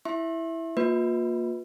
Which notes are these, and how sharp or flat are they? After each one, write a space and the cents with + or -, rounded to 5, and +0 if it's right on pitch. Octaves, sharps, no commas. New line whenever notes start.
E4 -5 E5 +0 C6 +45
A#3 +0 F4 +35 B4 +0